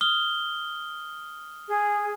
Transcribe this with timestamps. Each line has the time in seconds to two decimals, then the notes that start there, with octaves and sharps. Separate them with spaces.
0.01 D#6 F6 G7
1.68 G#4